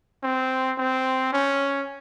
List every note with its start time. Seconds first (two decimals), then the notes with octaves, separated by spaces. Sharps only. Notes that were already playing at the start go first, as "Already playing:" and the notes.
0.23 C4
0.78 C4
1.33 C#4